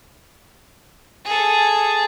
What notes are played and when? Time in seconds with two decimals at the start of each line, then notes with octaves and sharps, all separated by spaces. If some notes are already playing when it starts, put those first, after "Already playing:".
1.25 G#4 A4